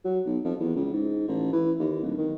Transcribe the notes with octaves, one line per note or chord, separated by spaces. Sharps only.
F#3
B1
F2
E2
C#2
G#2
A1
E3
D#2
D1
D#3